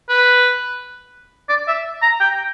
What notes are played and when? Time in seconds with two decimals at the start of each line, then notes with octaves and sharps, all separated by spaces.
0.09 B4
1.49 D5
1.67 E5
2.02 A#5
2.20 G5